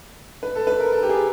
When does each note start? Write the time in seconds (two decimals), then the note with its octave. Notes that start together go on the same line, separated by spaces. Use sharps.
0.43 B4
0.55 A4
0.67 B4
0.80 A#4
0.92 A4
1.03 G4
1.09 G#4